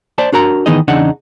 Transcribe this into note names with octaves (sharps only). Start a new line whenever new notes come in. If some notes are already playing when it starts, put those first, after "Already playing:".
C5 D5 A5
D4 F#4 A#4 A#5
D#3 E3 B3 D#4 G#4 D#5
E2 C#3 D4 D#4 F#5